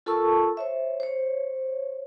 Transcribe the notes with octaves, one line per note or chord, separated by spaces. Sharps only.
F4 A4 A#4 A5 C#6 E6
C5 C#5 E5
C5 C#5